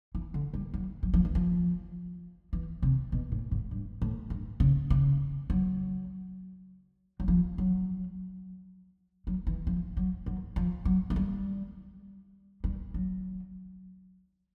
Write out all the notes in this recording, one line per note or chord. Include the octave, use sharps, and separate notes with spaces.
E3
D3
G3
F#3
F#3
F3
E3
F3
E3
C3
B2
A2
G#2
G2
A2
G2
C#3
C#3
F#3
F#3
F3
F#3
F#3
E3
F3
F#3
F#3
F3
F#3
G#3
G3
G3
F#3